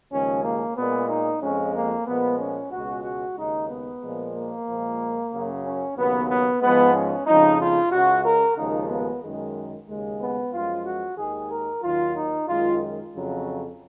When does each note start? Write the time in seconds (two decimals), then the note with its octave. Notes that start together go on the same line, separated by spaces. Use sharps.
0.11 D#2 C#3 F3 G#3 C#4
0.45 A#3
0.76 A#2 G#3 B3
1.09 D#4
1.41 F2 F3 G#3 C#4
1.75 A#3
2.07 A#2 F3 G#3 B3
2.39 C#4
2.71 C#2 B2 G#3 F#4
3.04 F#4
3.36 D#2 C#3 G#3 D#4
3.69 B3
4.02 A#2 F3 G#3
4.35 A#3
4.67 A#2 F3 G#3
5.32 F#2 C#3 F#3
5.64 C#4
5.96 D#2 C#3 F#3 B3
6.29 B3
6.61 G#2 F3 G#3 B3
6.94 C#4
7.27 F2 C#3 F3 G#3 D#4
7.59 F4
7.92 C#2 C#3 G#3 F#4
8.24 A#4
8.57 D#2 C#3 F3 G#3 D#4
8.89 B3
9.23 F#2 D#3 G#3
9.87 D#2 C#3 G#3
10.20 B3
10.52 F#2 F3 G#3 F4
10.85 F#4
11.17 D#2 D#3 G#3 G#4
11.51 A#4
11.82 D#2 D#3 F#3 F4
12.15 D#4
12.47 F#2 D#3 G#3 F4
13.13 F2 C#3 F#3